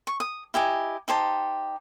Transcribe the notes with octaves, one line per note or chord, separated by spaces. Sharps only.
C#6
D#6
E4 G4 D#5 G#5
D#4 G4 C5 A5